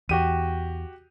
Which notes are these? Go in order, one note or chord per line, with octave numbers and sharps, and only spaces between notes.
E2 F#4 G4 D#7